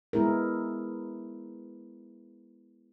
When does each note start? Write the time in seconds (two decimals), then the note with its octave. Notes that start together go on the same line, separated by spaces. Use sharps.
0.13 G#3 B3 E4 G#4 A#4